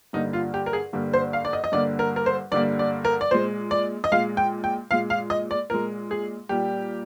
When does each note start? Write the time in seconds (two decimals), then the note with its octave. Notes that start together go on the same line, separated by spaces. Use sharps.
0.13 G2 D3 G3 A#3 D#4
0.33 F4
0.54 G4
0.66 A#4
0.73 G#4
0.93 G2 D3 G3 A#3
1.13 C5
1.33 F5
1.45 D5
1.53 D#5
1.64 D#5
1.72 G2 D3 G3 A#3 D5
1.99 A#4
2.16 A#4
2.26 C5
2.52 G2 D3 G3 A#3 D5
2.79 D5
3.05 A#4
3.21 D5
3.31 A#2 G#3 C5
3.71 D5
4.04 D#5
4.12 A#2 G#3 F5
4.37 G5
4.64 G5
4.91 A#2 G#3 F5
5.10 F5
5.30 D#5
5.51 D5
5.70 A#2 G#3 A#4
6.11 G#4
6.49 A#2 G3 A#3 G4